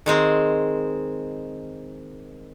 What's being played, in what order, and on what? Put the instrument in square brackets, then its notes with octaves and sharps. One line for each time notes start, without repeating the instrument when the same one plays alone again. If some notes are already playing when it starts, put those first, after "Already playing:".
[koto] D#3 G#3 C4